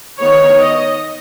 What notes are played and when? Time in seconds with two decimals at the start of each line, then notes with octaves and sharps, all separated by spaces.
0.20 D#3 B3 D#4 C#5
0.59 D#5